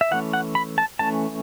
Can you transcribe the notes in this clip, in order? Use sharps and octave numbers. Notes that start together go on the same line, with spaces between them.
E5
E3 A3 C#4 F#5
F#5
B5
A5
E3 A3 C#4 A5